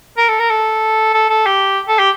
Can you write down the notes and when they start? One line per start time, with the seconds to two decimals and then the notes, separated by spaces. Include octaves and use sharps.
0.17 A#4
0.29 A4
0.39 A#4
0.50 A4
1.14 A4
1.30 A4
1.46 G4
1.88 A4
1.99 G4